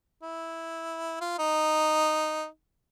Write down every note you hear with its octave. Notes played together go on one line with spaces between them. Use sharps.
E4
F4
D#4